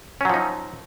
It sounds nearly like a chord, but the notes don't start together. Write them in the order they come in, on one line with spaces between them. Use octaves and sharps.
C#4 F#3 F3 D#4